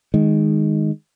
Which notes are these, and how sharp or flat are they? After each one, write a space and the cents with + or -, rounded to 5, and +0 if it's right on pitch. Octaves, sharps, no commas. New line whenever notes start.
D#3 +0 G#3 +0